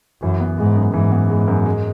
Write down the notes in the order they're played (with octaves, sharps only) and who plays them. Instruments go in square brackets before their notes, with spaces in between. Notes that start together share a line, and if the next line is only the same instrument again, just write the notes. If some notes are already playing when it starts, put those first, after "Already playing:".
[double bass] F#2 [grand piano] E3
[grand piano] B3
[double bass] G#2 [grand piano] G#3
[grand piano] F#2
[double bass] G#2 [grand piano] E3
[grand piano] B3
G#3
F#2
G#3